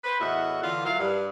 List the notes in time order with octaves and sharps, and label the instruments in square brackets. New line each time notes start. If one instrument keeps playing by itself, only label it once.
[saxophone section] B4 C5
E2 A2 F#4 D#5 E5 F#5
D3 E3 F4
F#3 E4 A#4 F5
G2